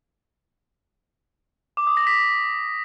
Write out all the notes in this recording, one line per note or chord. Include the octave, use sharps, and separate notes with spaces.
D6
D#6
A#6
B6